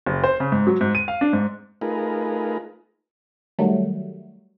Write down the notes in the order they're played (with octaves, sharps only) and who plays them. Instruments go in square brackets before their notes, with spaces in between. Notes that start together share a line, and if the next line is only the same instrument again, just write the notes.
[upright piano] F#1
C5
C#3
G#2
F#3
G#2
D#7
F5
D4
G#2
[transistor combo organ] A3 D#4 F4 G#4 A#4 B4
[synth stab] D#3 F#3 G3 A3